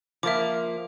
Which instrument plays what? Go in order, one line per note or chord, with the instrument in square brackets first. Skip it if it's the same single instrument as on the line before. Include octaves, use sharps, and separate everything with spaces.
[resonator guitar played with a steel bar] F3 A#3 [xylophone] E5 D6